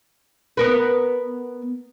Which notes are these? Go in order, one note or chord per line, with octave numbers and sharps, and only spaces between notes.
B3 A#4 B4